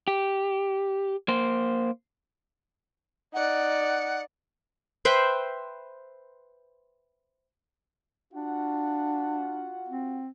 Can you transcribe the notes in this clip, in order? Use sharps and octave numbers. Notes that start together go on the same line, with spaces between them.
G4
A#3 C5
D#4 D5 F#5
B4 C5 E5 G5
D4 F4 F#4 F#5
C4